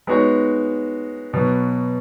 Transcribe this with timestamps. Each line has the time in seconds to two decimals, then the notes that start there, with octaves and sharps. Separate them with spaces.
0.07 G#3 B3 D#4 F#4 C#5
1.33 B2 F#3 B3